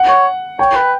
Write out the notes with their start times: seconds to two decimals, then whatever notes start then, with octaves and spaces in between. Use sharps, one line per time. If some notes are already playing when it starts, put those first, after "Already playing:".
Already playing: F#5
0.09 C#5
0.59 C#5 G5
0.76 B4